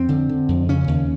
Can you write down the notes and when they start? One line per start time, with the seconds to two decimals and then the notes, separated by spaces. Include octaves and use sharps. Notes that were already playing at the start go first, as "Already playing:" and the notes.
Already playing: F2 C4
0.09 D3
0.29 D3
0.48 F2
0.69 C#3 C#4
0.88 D#2